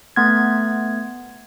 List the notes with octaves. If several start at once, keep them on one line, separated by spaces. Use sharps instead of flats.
A3 B3 G#6